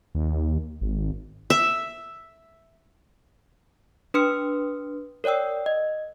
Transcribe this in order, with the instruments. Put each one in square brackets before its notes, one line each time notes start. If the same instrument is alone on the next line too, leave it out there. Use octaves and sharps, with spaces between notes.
[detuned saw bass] D#2
G#1
[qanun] E5
[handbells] D4 B4 C6 D#6 F6 C#7
A#4 C#5 D5 G5 E6
D#5